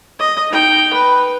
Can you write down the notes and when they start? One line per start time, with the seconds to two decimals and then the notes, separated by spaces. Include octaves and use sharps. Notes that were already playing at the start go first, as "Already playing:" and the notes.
0.19 D#5
0.51 D#4 G5
0.94 B4